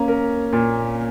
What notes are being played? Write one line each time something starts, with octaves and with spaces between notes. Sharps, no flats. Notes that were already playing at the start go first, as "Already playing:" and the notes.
Already playing: A#3 C#4
A#4
A#2